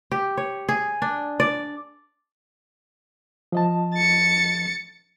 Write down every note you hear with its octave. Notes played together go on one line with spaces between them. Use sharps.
G4
C#5
G#4
D4
D5
F3 D#5 A5
A6 C#7